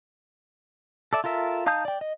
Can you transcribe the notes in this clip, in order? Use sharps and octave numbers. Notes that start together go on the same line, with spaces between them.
A4 D5 E5
F4 A4 A#4 E5
D#4 F5 A5 D#6 G6
D5 G5
D#5